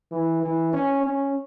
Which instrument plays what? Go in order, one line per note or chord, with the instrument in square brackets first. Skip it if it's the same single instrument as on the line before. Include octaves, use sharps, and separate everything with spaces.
[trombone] E3
E3
C#4
C#4